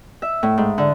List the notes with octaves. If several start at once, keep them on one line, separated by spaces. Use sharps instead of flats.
E5
A2
G#2
D3